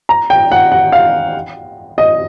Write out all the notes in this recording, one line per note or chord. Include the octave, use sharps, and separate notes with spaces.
A#5
G5
F#5
F#5
F5
D#5